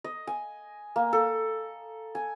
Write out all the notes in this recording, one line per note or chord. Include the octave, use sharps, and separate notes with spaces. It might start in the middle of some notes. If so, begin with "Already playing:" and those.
D#5
G#5
A#3
A4
G#5